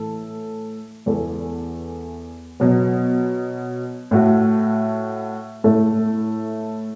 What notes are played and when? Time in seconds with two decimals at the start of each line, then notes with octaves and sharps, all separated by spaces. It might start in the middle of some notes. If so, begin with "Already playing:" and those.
Already playing: A2 E3 A3 A4
1.06 E2 E3 B3 A4
2.60 B2 F#3 B3
4.11 A2 A3 F#4
5.64 A2 A3 E4 A4